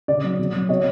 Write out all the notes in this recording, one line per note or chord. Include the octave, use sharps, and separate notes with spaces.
C#3 D5
F#3
B2
F#3
B2 C#5 D#5